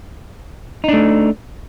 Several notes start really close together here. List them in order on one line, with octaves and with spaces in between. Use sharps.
D#4 D4 A3